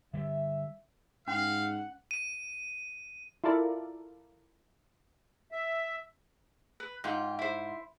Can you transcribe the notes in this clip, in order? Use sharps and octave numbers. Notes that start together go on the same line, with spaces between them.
D3 G3 E5
G#2 C#4 F5 F#5
D#7
E4 F4 A4 A#4 D5
E5
B4
G#2 F4 G5
E4 C5